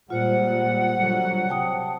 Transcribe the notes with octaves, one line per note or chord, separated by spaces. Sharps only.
A#2 G3 G#3 F4 C5 F#5
D3 F#3 G3
C3 G5 A5 D#6